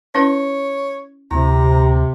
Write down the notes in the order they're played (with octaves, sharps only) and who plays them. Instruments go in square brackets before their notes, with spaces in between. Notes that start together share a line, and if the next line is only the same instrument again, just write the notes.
[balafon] C#4 E4 B4 [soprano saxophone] C#5
[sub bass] D2 [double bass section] C3 [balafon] E4 [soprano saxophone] A#5